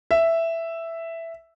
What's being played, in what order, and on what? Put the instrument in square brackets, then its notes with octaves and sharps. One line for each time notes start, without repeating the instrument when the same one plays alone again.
[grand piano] E5